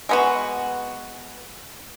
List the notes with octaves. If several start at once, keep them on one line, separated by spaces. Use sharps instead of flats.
G#3 B3 F#4